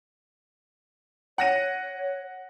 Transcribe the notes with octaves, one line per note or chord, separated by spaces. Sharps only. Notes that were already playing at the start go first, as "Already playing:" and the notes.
C#5 F#5 A#6 D#7